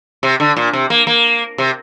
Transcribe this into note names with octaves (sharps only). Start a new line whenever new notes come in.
C3
D3
A#2
C3
A#3
A#3
C3